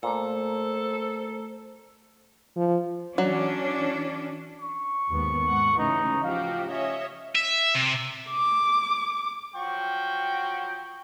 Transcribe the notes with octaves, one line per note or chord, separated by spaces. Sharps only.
A#2 A3 A4 C5 A#5
F3
E3 F#3 C#4 D4
C#6
D#2 G#2 B3
G#2 F#5
A2 C#3 E3 D#4
F3 F#4 G4 F5
C#4 C#5 D#5 E5
E5
C3
D6
F3 F#3 G5 C#6